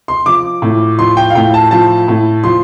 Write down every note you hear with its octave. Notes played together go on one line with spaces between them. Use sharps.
C6
F3 D6
A2
F3 C6
G5
F5
A2 G5
A5
F3 A5
A2
F3 C6